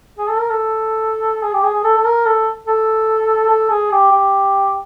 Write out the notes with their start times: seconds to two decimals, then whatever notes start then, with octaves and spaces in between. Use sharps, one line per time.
0.18 G#4
0.29 A4
0.39 A#4
0.50 A4
1.43 G#4
1.53 G4
1.63 G#4
1.73 G#4
1.84 A4
1.97 A4
2.05 A#4
2.25 A4
2.67 A4
3.49 A4
3.70 G#4
3.91 G4
4.12 G4